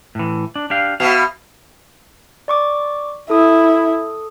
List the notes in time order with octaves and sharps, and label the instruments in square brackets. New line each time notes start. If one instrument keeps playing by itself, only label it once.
[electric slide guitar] A2 E3
D4
D4 G4 F5
[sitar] B2 [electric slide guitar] E5 F5
[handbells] D5 C#6 D6
[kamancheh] E4 [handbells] A4 D#6